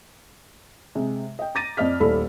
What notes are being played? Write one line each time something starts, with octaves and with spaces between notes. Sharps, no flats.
C3 G#3
D#5 G5
A#5 D6 A6 A#6 D#7
F2 D5 D#5 F6 B6
D#1 A3 E4 A4 D5 B5